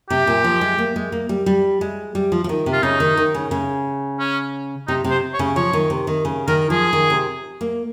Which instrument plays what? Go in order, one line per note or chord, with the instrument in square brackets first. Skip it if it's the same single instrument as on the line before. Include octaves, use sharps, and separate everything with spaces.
[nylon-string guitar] C3 [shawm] G4
[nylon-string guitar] A#2
F3
G#3
A#3
G#3
A#3
G3
G3
G#3
G3
F3
F3
D#3
C3
[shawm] F4
[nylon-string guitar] C#3 [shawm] D#4
[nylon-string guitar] D#3
D#3
C#3
C#3
[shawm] C#4
[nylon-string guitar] C3 [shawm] D#4
[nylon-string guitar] C3
[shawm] C5
C#5
[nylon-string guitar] C#3
[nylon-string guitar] F3 [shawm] C#5
[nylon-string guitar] D#3
C3
D#3
C#3
[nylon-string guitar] D#3 [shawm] A#4
[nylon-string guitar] F3 [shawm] G#4
[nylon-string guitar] D#3
C3
A#3